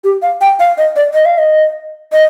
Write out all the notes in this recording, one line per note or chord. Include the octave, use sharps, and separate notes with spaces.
G4
F5
G5
F5
D#5
D5
D#5
F5
D#5
D#5